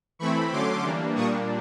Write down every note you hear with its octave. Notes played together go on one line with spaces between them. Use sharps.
E3 A3 C4 E4 B5 C#6
D3 F#3 A3 C#4 C6 D6
E3 G3 A#3 D4
A#2 G3 A#3 D4 C#6 D#6